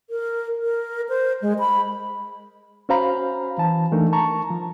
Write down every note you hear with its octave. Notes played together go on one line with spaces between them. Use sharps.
A#4
A#4
C5
G#3
B5
C#4 F#4 C5 F5 A#5 B5
E3 A5
E3 A3 D4 D#4 A#4
A5 A#5 C#6
F3